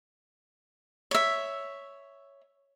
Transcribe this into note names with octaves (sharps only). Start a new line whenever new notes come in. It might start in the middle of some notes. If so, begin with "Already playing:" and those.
C#5 E5